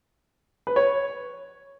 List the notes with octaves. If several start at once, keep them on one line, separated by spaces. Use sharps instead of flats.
B4
C#5